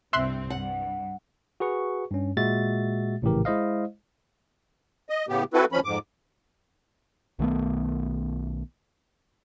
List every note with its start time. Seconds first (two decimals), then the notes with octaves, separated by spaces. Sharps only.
0.13 C2 G2 C4 E5 C6 F#6
0.50 G2 F#5
1.60 F#4 G#4 B4 C#6
2.11 G2 C#4
2.37 A#2 G#3 F#4 E5 A6
3.22 A#1 A2 C#3 E3 G4 A#4
3.45 G#3 E4 C5 D#5 F5
5.09 D#5
5.29 A2 C#3 B3 G4
5.54 C4 E4 F#4 A4 B4
5.72 D#2 F3 C#4 B5
5.84 F2 G#2 D6
7.39 B1 D#3 A3 B3